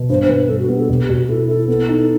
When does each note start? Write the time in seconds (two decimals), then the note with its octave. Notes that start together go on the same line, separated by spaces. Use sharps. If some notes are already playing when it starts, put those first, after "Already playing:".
Already playing: B2
0.09 G2 C5
0.23 C5
0.29 G2 B4
0.49 G2 A4
0.59 F#4
0.69 B3 G4
0.79 A4
0.89 B2 G4
1.09 B2 F#4
1.29 E4 A4
1.48 E4 A4
1.68 B3 A4
1.88 D#4